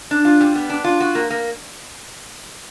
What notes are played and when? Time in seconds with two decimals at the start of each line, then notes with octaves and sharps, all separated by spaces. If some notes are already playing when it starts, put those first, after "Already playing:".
0.11 D4
0.25 F4
0.41 G3
0.56 B3
0.70 D4
0.84 F4
1.00 F#4
1.15 A#3
1.30 A#3